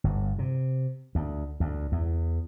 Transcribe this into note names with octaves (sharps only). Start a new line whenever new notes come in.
G1
C3
D2
D2
E2